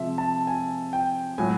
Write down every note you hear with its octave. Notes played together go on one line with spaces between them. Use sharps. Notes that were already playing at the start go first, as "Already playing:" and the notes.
Already playing: C3 F3 G#3 E5
A5
G#5
G5
A2 F#3 A3 G#5